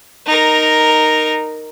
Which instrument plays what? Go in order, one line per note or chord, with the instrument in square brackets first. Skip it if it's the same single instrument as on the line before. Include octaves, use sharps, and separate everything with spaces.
[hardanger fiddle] D#4 A#4